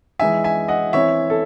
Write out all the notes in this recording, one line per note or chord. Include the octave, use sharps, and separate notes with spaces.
E3 G#3 D#4 E5 G#5
E5 G#5
D#5 F#5
E3 C4 E4 C#5 E5
A4